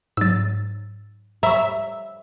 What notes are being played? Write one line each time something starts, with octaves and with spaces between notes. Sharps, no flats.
G#2 F#3 E6 A6
E5 A#5 B5 C#6